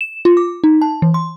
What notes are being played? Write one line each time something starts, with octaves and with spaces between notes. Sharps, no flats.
E7
F4
D6
D#4
A5
E3
C6